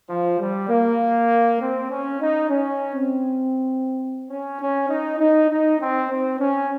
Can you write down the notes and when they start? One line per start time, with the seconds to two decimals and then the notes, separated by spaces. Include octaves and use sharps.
0.09 F3
0.40 G3
0.69 A#3
1.60 C4
1.90 C#4
2.20 D#4
2.50 C#4
2.94 C4
4.29 C#4
4.60 C#4
4.89 D#4
5.20 D#4
5.50 D#4
5.80 C4
6.10 C4
6.39 C#4